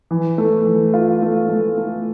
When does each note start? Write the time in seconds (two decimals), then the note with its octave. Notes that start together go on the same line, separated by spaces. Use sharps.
0.11 E3
0.38 A3
0.66 E3
0.94 F4
1.22 A3
1.49 A3
1.78 A3